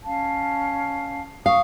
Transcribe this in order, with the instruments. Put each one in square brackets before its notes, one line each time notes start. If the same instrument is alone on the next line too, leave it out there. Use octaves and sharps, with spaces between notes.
[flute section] C#4 F5 A5
[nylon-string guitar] F5 [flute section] C#6 D#6